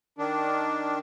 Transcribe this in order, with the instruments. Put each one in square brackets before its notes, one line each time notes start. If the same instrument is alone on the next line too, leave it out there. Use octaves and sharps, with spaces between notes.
[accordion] D#3 D4